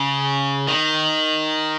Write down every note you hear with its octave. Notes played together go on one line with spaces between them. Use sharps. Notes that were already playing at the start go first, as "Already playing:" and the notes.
Already playing: C#3
D#3